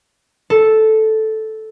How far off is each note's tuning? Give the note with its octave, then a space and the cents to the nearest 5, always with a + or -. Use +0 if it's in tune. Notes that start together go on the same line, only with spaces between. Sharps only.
A4 -5